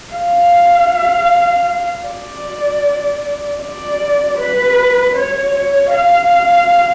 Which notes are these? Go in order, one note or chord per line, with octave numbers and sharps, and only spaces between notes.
F5
D5
D5
B4
C#5
C#5
F5